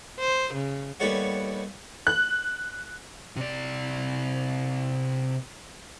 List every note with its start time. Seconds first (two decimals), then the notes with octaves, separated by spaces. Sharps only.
0.20 C5
0.54 C#3
1.00 D#2 G3 B3 A4 C#5 F#5
2.07 F#6
3.36 C3 D5